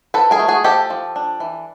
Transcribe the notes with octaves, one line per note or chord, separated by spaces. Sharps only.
F3 A4 B4
G#4 A#4
A3
F#4 G#4
F3 G4 A4
F3
D4
E3